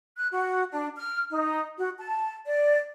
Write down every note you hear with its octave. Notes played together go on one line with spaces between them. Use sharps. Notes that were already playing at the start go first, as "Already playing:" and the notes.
F#6
F#4
D4
F6
D#4
F#4
A5
D5